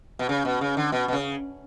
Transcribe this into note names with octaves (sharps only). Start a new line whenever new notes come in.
B2
C#3
B2
C#3
D3
B2
B2
C#3